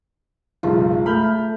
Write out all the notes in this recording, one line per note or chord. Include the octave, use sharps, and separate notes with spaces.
F#1 B1 G#3 F4
A3 B5 F6 G6